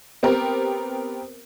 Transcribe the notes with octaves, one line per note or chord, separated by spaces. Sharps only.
B3 C4 G4 A#4